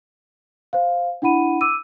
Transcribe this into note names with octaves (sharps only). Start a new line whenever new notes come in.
C5 F5
D4 E4 F#5 B5 D#7
D6 E6 D#7